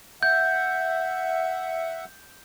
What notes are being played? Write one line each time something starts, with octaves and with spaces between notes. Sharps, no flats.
E5 F#5 G6